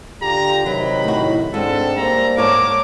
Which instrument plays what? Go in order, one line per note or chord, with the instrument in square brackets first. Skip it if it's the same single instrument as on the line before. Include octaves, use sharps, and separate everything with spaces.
[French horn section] D3 F4 G4 [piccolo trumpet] A#5
[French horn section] C3 D#3 [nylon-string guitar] F#3 [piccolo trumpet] B5
[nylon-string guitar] A2 F#4
[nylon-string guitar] G#2 [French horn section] C4 D4 G#4 [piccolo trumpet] A4
[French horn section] G3 A#3 C5 [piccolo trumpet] A#5
[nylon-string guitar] G#2 C#5 A5 [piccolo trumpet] A#4 [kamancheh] D6